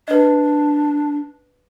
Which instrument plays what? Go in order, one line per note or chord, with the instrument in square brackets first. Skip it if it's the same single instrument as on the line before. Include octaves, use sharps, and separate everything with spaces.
[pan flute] D4 [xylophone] B4 D#5